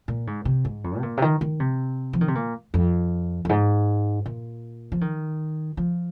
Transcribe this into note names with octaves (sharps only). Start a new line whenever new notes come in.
A#2
G#2
C3
G#2
F2
C3
A#2
C3
D#3
D#3
C3
F3
D#3
C3
A#2
F2
F2
G#2
A#2
F3
D#3
F3